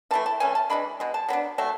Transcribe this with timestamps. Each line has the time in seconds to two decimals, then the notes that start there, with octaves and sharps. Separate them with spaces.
0.11 E3 A3 E4 A5
0.26 A5
0.40 E3 A3 C#4 G#5
0.55 A5
0.70 E3 G#3 D4 B5
1.00 B2 G#3
1.14 A5
1.29 F#3 B3 D4
1.58 F#3 A3 A5